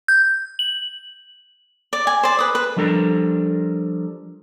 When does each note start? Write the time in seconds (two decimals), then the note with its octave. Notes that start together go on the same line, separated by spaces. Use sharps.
0.08 G6
0.59 F#7
1.93 D5
2.07 G#5
2.23 C5 D5
2.39 B4 D#6
2.55 B4
2.77 F3 G3 D4 A4 A#4